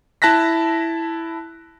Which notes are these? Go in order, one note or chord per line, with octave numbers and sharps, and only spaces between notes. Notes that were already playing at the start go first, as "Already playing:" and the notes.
E4 A5 F#6 A#6 B6